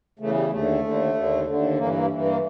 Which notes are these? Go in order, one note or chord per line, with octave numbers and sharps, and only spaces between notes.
E2 C#3 E3 A3
G3
D#2 D3 A3
D#2 D3
D#2 D3
D#2 D3
G2 E3 A#3
A#3
G2 E3
A#3